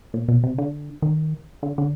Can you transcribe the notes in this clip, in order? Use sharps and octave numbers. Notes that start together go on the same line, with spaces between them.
A#2
B2
C3
D3
D#3
D3
D3